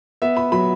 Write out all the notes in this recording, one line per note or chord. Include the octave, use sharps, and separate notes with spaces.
B3 E5
B5
F#3 B5